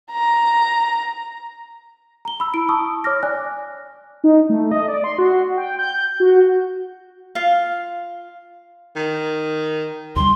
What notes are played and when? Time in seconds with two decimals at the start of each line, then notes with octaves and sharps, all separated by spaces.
0.11 A#5
2.25 A#5 G7
2.40 B5 E6
2.54 E4 B5 D7
2.69 A5 C#6 D#6 E6
3.04 C#5 D6 F6 A#6
3.23 D5 G#5 F#6
4.24 D#4
4.49 A3
4.71 D#5
4.88 D5
5.04 C6
5.18 F#4
5.57 G5
5.79 G6
6.20 F#4
7.35 F4 F5
8.96 D#3
10.16 D#2 C#3 G3 C6